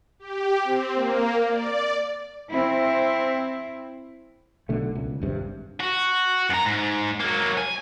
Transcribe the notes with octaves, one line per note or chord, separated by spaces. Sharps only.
G4
C4
A#3
D5
C4 E4
B1 B2 D3 A3
C#2
G#1 G2 C3
F#4
F#2 A#5
G#2
F#3 A#3
G#5